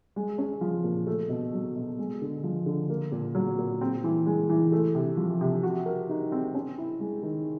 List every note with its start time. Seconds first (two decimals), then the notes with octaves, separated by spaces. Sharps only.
0.16 G#3
0.38 C#4
0.61 F3
0.84 A#2
1.07 A3
1.29 B2
1.53 F#3
1.76 B2
1.99 G#3
2.22 D3
2.44 F3
2.66 D3
2.90 A#3
3.12 A#2
3.35 F#3
3.58 A#2
3.81 C4
4.04 E3
4.26 G#3
4.49 E3
4.72 A3
4.95 C3
5.17 F3
5.41 C3
5.63 F#4
5.86 A#4
6.09 D#4
6.32 C4
6.55 C#4
6.78 E4
7.00 G#3
7.23 D#3